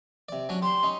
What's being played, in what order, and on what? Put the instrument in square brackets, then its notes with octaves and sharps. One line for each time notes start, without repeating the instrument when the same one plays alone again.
[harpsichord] C3 D5
F#3 C#4 D4
[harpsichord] G4 [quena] C6
[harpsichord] C#4 D#4